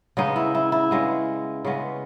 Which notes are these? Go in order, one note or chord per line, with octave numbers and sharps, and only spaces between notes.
C#3 G#3 B3 D#4
E4
E4
E4
C#3 G#3 B3
C#3 G#3 B3